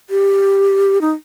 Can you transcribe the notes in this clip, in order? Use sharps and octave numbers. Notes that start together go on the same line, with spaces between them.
G4
D#4